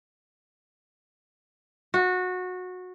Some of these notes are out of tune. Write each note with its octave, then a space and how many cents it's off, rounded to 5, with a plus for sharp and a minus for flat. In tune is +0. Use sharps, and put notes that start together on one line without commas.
F#4 -20